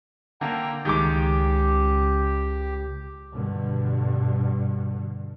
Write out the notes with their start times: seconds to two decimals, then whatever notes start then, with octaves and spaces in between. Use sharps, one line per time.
0.41 D3 A#3 G5 A#5
0.85 C#2 D#3 G#3 G4 D6
3.34 G2 B2 D3